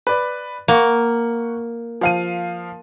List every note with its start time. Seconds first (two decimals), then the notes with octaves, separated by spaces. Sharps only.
0.07 B4 D5
0.68 A#3 F#5 C#6
2.01 F3 F5 D#7